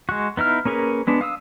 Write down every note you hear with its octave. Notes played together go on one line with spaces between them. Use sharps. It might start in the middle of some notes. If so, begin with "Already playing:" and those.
G#3 F#4
B3 D#4 E4 F6
A#3 C#4 G#4 A#4 B4
G#3 B3 D4
F5 D#6 E6